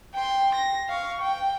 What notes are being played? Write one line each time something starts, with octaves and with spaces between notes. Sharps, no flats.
G5 C6
A#6
F5 C#6
G5